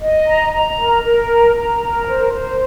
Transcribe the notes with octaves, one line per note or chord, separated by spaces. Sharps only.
D#5
A#5
A#5
A#4
A#4
A#5
A#5
A#4
C5
C5